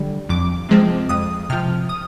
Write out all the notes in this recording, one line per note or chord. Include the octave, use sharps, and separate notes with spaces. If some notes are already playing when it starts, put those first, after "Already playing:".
Already playing: D3 G3
F2 D6
C3 F3 G#3 C4
F2 D#6
C3 F3 F6
D#6